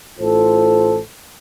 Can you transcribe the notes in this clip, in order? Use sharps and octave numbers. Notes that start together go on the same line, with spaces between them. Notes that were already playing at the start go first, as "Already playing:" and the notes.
A1 A2 F4 A4 C5